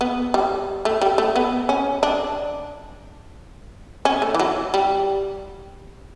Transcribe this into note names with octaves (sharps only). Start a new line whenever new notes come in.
B3
G3
A3
G3
A3
B3
C#4
D4
C#4
A3
E3
F#3
G3